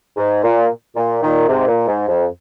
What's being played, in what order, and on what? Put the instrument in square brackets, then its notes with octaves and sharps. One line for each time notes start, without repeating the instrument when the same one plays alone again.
[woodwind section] G#2
A#2
A#2
A#2 D#3
G#2 C3
A#2
G#2
F2